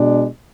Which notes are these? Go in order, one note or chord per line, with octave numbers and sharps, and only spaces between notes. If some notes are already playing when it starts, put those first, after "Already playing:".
Already playing: B2 G#3 D4